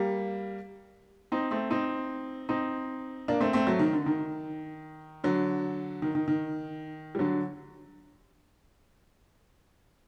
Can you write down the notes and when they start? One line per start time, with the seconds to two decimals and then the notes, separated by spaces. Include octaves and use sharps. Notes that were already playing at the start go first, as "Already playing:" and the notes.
Already playing: G3 A#3
1.32 C4 D#4
1.51 A3 C4
1.70 C4 D#4
2.49 C4 D#4
3.28 A#3 D4
3.41 A3 C4
3.53 A3 C4
3.67 F#3 A3
3.79 D#3
3.93 D3
4.06 D#3
5.24 D3 F#3
6.02 D#3
6.15 D#3
6.28 D#3
7.15 G3
7.19 D3 F#3